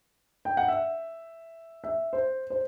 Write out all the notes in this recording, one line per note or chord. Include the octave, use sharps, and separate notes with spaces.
G5
F#5
E5
E5
C5
C5